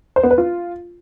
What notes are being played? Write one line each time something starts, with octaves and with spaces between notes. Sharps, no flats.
C5
B3
B4
F4